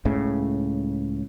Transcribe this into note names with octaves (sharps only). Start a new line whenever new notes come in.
C#2 A2 C#3